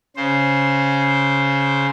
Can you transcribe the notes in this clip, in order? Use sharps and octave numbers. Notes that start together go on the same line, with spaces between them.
C#3 C5